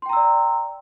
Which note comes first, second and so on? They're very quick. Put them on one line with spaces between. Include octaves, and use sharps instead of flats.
C6 G5 A#5 E6 D5